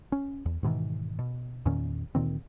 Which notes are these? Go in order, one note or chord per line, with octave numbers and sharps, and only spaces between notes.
C#4
E2
G#2 B2 D#3 E3
B2
E2 A#2 D#3 C#4
D2 A#2 D#3 C4